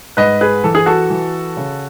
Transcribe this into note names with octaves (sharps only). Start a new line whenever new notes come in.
G#2 B4 D#5
G#4 B4
E3 A4
G#4
F#4 A4
E3
C#3